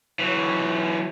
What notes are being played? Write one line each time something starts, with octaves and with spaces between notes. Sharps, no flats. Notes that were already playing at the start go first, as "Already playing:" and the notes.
E3 F#3